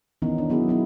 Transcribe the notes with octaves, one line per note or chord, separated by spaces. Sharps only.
D#3 E3 B3 C#4 D#4
D4
F#3 B3 E4 G#4
F#3 B3 D#4 E4